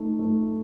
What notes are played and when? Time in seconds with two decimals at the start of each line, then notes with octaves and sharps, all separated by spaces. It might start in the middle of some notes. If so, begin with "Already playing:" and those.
Already playing: A3 D#4 A4
0.19 A3